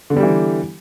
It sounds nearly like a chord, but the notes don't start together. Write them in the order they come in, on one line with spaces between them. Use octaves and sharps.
D3 B3 G3 G4 E3